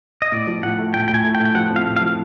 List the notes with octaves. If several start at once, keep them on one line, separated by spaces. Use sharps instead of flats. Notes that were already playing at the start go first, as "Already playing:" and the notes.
D#5
A2 D5
F3
A2 F#5
A3
A2 G5
A2 G5
G#5
A3
G5
A2
G5
F3 F#5
C4
F5
A2
F5
F3